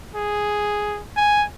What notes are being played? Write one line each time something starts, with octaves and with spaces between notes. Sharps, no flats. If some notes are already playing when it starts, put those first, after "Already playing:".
G#4
G#5